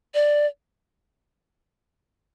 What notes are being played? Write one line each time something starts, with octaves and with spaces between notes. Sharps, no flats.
D5